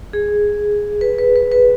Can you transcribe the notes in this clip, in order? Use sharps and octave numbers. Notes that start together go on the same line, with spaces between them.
G#4
B4
B4
B4
B4